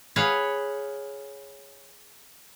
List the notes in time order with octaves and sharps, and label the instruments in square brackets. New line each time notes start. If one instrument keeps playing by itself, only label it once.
[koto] G#4 B4 C#5 F5 F#5